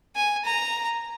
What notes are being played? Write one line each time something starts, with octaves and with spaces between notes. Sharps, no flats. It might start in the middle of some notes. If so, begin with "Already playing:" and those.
G#5
A#5